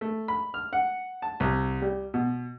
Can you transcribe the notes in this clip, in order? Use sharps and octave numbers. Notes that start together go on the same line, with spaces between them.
A3
B5
F6
F#5
A5
C2
G3
B2